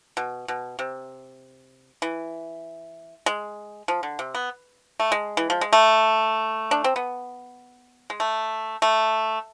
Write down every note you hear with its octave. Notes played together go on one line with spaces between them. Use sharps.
B2
B2
C3
E3
G#3
F3
D3
C3
B3
A3
G#3
E3
F3
G#3
A3
D4
C4
B3
G#3
A3
A3